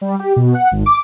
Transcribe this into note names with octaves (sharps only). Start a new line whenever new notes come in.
G3
G4
B2
F#5
G#1
D6